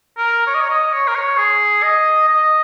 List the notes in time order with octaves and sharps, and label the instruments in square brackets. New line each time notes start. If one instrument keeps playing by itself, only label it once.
[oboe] A#4
C#5
D#5
C#5
D#5
C#5
A#4
C#5
G#4
D#5
D#5